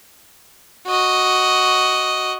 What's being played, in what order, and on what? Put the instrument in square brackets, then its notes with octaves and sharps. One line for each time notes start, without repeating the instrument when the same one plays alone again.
[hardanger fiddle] F#4 D#5